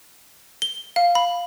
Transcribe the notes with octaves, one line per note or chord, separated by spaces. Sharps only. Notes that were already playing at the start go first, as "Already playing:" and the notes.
G7
F5
B5